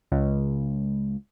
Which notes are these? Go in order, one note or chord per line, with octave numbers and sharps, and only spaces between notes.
C#2